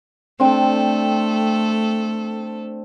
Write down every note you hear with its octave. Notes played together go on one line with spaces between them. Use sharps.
A3 C4 D4 A4 G5